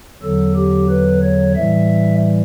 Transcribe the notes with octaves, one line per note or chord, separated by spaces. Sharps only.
E2 D3 F#3 A4
G4
B4
C#5
A2 E3 G3 E5